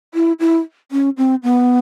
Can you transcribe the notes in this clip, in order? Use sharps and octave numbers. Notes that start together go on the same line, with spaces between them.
E4
E4
C#4
C4
B3